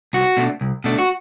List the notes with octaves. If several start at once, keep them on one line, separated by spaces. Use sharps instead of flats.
C2 F#4
B2 A3 D4
C2
B2 A3 D4
F#4